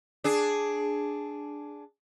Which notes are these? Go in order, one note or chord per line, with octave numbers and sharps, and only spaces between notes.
D4 G#4